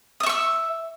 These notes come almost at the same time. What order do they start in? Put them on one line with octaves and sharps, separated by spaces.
D#6 E5 C#6 E6